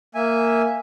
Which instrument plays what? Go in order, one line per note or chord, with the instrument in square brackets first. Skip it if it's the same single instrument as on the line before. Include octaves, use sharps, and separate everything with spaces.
[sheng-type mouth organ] A#3 E5 G#5